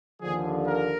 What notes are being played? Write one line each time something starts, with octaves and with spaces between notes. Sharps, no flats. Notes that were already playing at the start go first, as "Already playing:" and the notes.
D#2 D3 F3 G#4
A#4